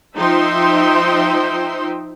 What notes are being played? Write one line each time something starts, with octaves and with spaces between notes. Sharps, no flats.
F3 D#4 C5 E5 G5 C6